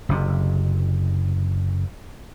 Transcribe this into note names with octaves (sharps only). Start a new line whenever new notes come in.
F#1 C3